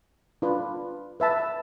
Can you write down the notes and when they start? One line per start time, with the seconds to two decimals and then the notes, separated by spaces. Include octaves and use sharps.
0.42 D4 F4 B4
1.20 B4 E5 A5